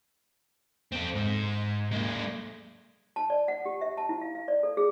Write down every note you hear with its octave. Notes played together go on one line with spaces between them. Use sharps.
C4 A4
G#2
G#3 A#3
A5
D5
F#5
G4
E5
A5
E4
F5
F5
D5
A4
G#4